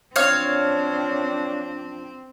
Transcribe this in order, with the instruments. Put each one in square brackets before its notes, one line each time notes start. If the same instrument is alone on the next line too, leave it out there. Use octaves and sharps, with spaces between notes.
[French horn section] F3 D4 [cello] C4 [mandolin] C#5 F5